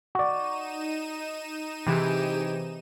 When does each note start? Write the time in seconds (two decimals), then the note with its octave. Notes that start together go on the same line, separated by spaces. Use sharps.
0.15 D#4 F#4 D5 D#7 E7
1.87 C3 E3 G4 G#4